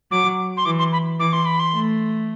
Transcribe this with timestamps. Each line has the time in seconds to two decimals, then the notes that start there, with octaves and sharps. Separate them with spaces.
0.11 F#3 D6
0.57 C6
0.65 E3 D6
0.79 C6
0.93 B5
1.19 E3 D6
1.33 C6
1.46 B5
1.60 C6
1.74 A3